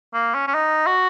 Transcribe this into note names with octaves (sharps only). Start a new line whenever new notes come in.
A#3
C#4
C#4
D#4
F#4